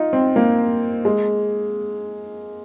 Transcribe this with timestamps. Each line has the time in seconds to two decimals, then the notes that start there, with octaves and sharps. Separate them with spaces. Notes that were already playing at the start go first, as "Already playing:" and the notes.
Already playing: D#4 F4
0.13 C4
0.36 A#3
1.05 G#3